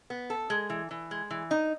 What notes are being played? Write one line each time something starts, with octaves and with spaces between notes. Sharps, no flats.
B3
A4
G#3
E3
E3
G#3
E3
D#4